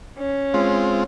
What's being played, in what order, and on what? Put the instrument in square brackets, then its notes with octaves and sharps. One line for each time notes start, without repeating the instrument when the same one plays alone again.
[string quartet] C#4
[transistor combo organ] G#3 C4 F4